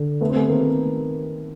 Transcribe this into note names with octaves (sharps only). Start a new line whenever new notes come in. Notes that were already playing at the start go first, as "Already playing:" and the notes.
Already playing: D3
A3 B3
C4
A3 B3
D#3 A#3 C4